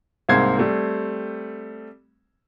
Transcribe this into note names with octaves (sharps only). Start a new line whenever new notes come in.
C2 G#2 A#3 C4 G#6 C7
G3 A3 C4